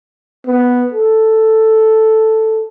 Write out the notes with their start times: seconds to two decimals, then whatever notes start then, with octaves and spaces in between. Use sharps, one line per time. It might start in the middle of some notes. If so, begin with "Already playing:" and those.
0.47 B3
0.92 A4